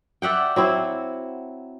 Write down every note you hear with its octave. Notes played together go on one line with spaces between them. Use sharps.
D5 E5 F#5 G5
F#3 C4 E4